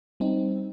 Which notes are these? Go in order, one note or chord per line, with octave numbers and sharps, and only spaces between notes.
G3 C4 D#4